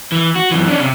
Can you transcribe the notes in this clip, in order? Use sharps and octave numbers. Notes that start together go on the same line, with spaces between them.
E3
F#4
F#2 E3
C#4 D4
C3